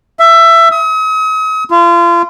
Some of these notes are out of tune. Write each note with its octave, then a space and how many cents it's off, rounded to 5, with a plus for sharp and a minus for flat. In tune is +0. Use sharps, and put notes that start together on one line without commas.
E5 +15
D#6 +40
F4 -35